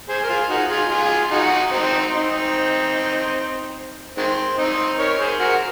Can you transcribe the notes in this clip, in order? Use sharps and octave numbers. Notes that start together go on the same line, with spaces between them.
G#4 C5
A#4
F4 G#4
D#4 F#4
F4 G#4
F4 G#4
D#4 F#4
C4 D#4
C4 D#4
D#3 G#3 C4
C4 D#4
A#4 C#5
G#4 C5
F#4 A#4